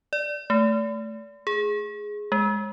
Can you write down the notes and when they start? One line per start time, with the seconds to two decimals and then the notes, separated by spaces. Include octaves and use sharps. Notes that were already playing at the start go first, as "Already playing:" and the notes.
0.13 D5
0.50 A3
1.47 G#4
2.32 G#3